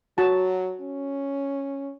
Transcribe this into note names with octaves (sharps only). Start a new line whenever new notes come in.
F#3 F#4 A5
C#4